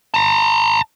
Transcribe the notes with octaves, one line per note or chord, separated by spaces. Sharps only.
A5 A#5